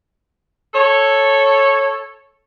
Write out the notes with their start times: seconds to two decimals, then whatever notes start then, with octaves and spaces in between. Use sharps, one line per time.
0.75 A4 C#5